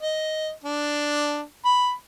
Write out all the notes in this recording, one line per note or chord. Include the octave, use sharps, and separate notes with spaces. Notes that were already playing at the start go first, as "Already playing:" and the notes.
D#5
D4
B5